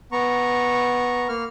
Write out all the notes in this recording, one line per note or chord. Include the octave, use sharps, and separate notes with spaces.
B3 A#5 C#6
A#3 F6